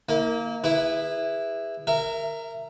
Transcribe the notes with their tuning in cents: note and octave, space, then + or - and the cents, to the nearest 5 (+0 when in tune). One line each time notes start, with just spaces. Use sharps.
A#3 +0 E4 -40
E4 +0 G#4 -30 B4 +0
A#4 -15 E5 +20